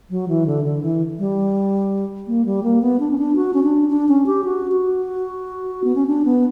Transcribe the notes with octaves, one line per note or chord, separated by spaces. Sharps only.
F#3
E3
D3
D3
E3
G3
A#3
G3
A#3
B3
D4
C#4
D4
F#4
C#4
D4
D4
C#4
G4
F#4
F#4
B3
C#4
D4
B3